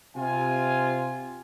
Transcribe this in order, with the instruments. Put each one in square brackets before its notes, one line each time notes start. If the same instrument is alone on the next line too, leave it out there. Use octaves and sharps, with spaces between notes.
[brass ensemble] C3 F4 G#5